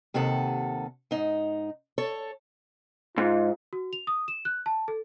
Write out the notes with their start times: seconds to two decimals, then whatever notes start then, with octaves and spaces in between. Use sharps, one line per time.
0.14 D#2 C3 D#3 A4 F#5
1.11 G#2 D#4
1.98 A4 C#5
3.18 G#2 F4
3.73 F#4
3.93 F7
4.07 D#6
4.28 E7
4.45 F#6
4.66 A5
4.88 A4